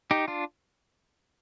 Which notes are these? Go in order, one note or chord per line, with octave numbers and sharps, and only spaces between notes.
D#4 G4
D4 F4